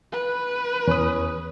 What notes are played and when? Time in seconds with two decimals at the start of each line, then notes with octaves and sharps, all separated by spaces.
0.12 B4
0.87 E2 C#4 D#6